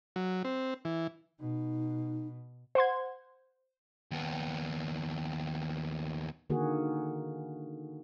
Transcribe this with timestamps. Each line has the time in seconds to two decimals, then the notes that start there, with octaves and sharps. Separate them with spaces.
0.16 F#3
0.45 C4
0.85 E3
1.40 B2 D#4
2.75 C5 F#5 C6 G#6
4.11 D#2 B3
6.50 D3 D#3 A#3 F#4 G#4